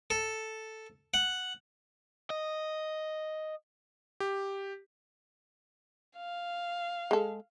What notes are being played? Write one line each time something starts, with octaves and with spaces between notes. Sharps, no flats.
A4
F#5
D#5
G4
F5
G#3 A4